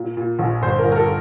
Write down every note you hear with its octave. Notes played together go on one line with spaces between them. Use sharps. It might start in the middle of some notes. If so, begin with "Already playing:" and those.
Already playing: A#2
A#2
A#1
G1 C5
A#4
G1
A#4
A4